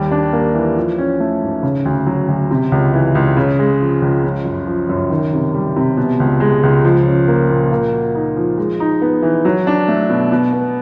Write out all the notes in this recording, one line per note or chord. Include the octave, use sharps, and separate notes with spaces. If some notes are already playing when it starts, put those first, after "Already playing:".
Already playing: D#2 G3
D4
A#3
E3
F3
C#4
A3
G#2
C#3
D2
F#3
D2
C3
C#2
E3
C#2
C#3
G#3
F3
C#2
C#3
F#2
F3
F#2
D#3
C3
G3
C3
B2
C#2
G#3
C#2
F3
C#4
A#3
A#2
A#3
F#4
D#4
F3
G#3
D#4
B3
E3
F#3
D4
A3
B2
B2
B3